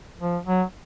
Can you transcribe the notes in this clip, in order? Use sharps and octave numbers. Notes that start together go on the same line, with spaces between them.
F3
F#3